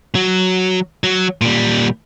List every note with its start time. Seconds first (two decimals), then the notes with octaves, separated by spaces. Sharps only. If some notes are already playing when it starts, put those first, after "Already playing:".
0.15 F#3
1.04 F#3
1.41 A#2 G3